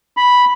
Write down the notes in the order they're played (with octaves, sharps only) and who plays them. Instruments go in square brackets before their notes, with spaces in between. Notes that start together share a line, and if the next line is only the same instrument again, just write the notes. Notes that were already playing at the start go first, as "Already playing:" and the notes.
[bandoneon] B5